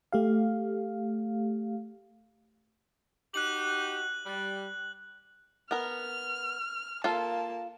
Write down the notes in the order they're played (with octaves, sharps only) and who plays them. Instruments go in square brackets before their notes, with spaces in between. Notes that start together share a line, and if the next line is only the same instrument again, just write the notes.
[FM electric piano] A3 G4 F5
[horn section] D#4 F#4 G4 [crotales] F#6 F#7
[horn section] G3
[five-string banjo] B3 A#4 [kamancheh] F6
[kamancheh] A#3 A5 [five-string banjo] F4 A4 F5